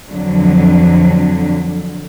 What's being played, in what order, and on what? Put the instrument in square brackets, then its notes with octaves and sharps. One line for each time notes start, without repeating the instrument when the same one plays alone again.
[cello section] F2 D3 F#3